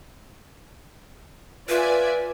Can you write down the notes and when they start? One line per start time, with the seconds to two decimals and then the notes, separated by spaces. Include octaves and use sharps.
1.69 F4 B4 D5 E5 G#5